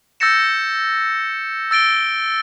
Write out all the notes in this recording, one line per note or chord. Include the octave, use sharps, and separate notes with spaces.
E6 G6 A6 A#6 C#7 E7
E6 A6 D7 G7